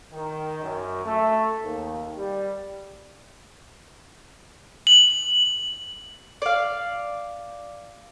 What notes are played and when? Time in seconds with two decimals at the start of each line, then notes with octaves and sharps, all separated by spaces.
0.10 D#3
0.61 F#2
1.04 A3
1.62 D#2
2.16 G3
4.87 F#7
6.42 D5 F5